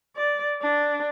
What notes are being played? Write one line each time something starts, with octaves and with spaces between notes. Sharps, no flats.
D5
D4